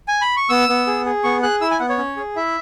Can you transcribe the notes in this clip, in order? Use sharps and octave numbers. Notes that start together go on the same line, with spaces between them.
G#5
B5
C#6
B3 E6
B3
G#4
G#4
B3 C#6
G#4 F#6
E4 E6
G#5
B3 F#5
C#5
C#4
G#4
E4 E5